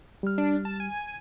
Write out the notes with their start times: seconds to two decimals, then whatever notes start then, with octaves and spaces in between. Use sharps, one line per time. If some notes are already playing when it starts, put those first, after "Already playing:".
0.23 G3 F6
0.38 D4
0.65 A5
0.80 G#5